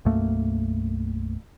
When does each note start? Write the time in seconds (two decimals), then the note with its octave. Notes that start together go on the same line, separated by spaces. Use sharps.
0.05 B1 F#2 A3 A#3